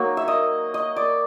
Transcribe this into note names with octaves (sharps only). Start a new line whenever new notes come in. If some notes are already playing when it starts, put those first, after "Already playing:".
Already playing: F#3 A#3 D#4 C#5
E5
D#5
D#5
D5